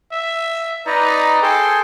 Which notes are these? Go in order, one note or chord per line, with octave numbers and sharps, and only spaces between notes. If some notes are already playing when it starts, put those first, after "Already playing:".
E5
D#4 B4 D5 A#5
G#4 A4 G5 C6